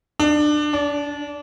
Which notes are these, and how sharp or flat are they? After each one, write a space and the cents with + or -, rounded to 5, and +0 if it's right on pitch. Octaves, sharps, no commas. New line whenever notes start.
D4 +25
D4 -25